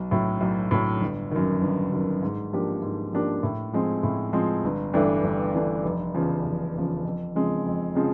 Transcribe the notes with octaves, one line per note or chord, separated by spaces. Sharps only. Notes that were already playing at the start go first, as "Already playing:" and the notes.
Already playing: B1
A2 F#3
B1
A2 F#3
G1
F#2 D#3
G1
F#2 D#3
G#2
F3 A#3 D4 G4
G#2
F3 A#3 D4 G4
A2
F3 G#3 C4
A2
F3 G#3 C4
G1
G2 E3 A3 D4
G1
G2 E3 A3 D4
F1
E2 C#3 F3
F1
E2 C#3 F3
F2
C#3 F3 G#3 C4
F2
C#3 F3 G#3 C4